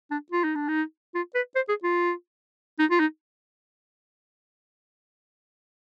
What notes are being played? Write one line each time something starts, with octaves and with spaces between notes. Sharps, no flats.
D4
F4
D#4
D4
D#4
F4
B4
C5
G#4
F4
D#4
F4
D#4